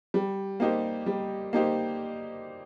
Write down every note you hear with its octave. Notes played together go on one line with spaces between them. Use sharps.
G3
A#3 D#4 G4 C5
G3
A#3 D#4 G4 C5